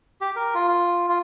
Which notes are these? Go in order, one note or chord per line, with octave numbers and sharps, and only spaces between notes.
G4
A#4
F4
F4
F4